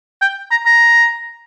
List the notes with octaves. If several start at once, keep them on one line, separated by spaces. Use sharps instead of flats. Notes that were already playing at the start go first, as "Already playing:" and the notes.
G5
A#5
A#5